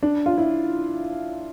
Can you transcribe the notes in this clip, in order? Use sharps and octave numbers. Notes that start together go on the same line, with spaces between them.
D4
F4
E4